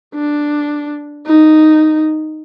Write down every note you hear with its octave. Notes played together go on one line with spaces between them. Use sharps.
D4
D#4